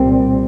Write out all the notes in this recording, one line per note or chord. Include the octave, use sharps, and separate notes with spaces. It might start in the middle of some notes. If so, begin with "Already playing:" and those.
Already playing: C2 A#2 G3 C4